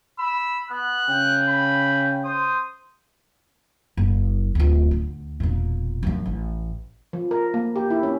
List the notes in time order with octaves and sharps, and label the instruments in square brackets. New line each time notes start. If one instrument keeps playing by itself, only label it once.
[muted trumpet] B5 [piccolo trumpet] E6
[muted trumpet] B3 [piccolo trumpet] F#6
[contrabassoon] C#3 [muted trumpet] G5
[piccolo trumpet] B5
[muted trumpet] C5 [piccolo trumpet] D#6
[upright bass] F#1
D1 F4
D2
E1 A#2
F#2 F3
A1
[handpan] F3
A#4
A#3
G4
E4
C#4